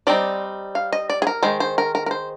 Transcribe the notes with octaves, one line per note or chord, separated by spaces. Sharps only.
G3 C4 D#4 D5
F5
D#5
D5
G#4
A#4
D#3 G#3 C5
C5
A#4
A#4
A#4
C5